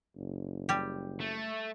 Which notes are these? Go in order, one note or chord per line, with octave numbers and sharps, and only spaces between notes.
F#1
G3 G4
A3